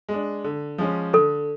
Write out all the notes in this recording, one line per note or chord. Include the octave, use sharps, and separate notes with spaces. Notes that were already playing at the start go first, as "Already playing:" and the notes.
G#3
D4
D3
F3 G#3 C#4
D3 A4